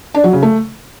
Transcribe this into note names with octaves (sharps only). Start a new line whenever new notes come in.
D4
F#3
C#3
A3